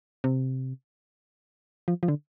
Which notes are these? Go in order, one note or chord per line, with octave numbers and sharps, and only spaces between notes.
C3
F3
F3
D3